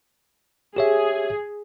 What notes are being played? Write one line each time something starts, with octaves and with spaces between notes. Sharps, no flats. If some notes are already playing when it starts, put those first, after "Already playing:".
G4 G#4 C#5 E5